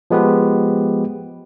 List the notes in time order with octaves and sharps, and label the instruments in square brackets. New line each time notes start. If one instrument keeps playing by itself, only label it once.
[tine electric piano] F3 G#3 B3 G4 B4